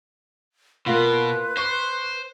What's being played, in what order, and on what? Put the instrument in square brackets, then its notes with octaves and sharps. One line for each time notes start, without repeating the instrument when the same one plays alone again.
[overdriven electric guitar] B2 [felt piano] A#3 F4 [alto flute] B4
[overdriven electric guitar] C5 [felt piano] C#6